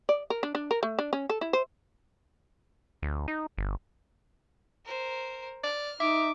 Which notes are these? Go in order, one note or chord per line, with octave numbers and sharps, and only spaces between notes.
D5
A#4
D4
D4
A#4
A3
D4
C#4
A4
E4
C5
D2
D#4
G1
A#4 C5
D5 F6
D#4 E5 D6